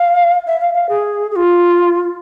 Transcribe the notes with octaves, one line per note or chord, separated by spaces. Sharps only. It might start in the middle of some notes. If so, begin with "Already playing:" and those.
Already playing: F5
E5
F5
F5
G#4
G#4
F4